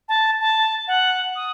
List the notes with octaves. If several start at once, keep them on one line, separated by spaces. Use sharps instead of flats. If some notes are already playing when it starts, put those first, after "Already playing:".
A5
A5
F#5
D#6